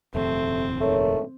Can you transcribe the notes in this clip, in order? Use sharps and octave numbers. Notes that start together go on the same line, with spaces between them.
D#1 F2 C3 A3 C4
G#2 A3 A#4 C#5